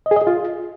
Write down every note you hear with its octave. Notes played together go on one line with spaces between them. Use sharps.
D#5
G#4
D#5
G#4
F4